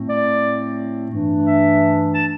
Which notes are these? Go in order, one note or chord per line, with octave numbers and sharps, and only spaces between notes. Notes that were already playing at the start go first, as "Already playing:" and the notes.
Already playing: A2 A3 C4
D5
G2 E3 A3 D4
E5
A5